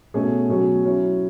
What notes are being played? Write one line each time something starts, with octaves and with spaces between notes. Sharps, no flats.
B2 A3 C#4 G#4
B2 F#3 C#4 G#4
F#3 C#4 E4